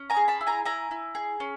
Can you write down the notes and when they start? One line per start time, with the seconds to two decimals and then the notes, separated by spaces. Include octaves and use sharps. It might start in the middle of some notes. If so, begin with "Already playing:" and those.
Already playing: C#4
0.10 G#5 A#5
0.17 G#4
0.28 A5 B5
0.41 E4
0.47 G#5 A#5
0.65 E4 G#5 A#5
0.91 E4
1.15 G#4
1.40 C#4